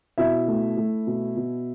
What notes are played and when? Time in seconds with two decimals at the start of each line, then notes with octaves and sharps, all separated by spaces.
0.18 B2 E4 E5
0.48 A3
0.77 A3
1.07 B2
1.36 B2